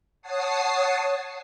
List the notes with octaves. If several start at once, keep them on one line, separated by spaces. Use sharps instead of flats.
C#5 F#5 A5 D#6 C7